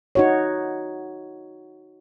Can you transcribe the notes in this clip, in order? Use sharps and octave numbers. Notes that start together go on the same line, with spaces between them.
D#4 F#4 C#5